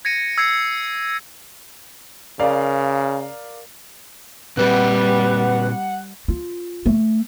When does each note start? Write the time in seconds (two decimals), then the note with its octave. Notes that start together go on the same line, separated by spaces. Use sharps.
0.05 G#6 A#6 C#7 D#7
0.38 E6 G#6 C7 C#7
2.40 C#3 A#4 D5 F5
4.57 A#2 G3 C4 B4 F#5
6.28 F4
6.86 A3